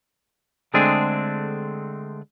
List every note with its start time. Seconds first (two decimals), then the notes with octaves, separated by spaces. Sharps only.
0.74 D3 G#3 A3 C4 D4 G#4